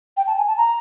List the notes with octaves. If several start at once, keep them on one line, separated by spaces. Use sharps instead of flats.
G5
A5
G#5
A5
A#5